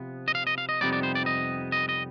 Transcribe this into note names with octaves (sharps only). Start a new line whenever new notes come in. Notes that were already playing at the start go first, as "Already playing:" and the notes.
Already playing: C3 F3 B3
D#5
F5
D#5
F5
D#5
F2 C3 G3 B3 D#4 D5
D5
C5
D5
D#5
D#5
D#5